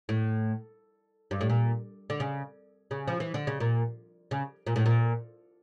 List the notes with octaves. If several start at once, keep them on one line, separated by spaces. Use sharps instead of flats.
A2
G2
A2
A#2
D3
C#3
C#3
F3
E3
D3
C#3
A#2
C#3
A#2
A2
A#2